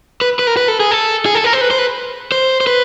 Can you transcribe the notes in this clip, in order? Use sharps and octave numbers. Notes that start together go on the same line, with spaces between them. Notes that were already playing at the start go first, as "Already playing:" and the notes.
B4
B4
A#4
B4
A4
G#4
A4
G#4
A4
A#4
C5
B4
C5
B4
C5
C5
B4